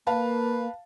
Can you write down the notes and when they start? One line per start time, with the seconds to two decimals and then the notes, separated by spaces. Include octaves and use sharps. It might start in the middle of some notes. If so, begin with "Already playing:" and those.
0.07 A#3 B4 F5 A5